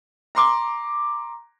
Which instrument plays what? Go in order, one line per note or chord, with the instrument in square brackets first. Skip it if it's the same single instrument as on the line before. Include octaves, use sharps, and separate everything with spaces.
[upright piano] A#5 C6 D6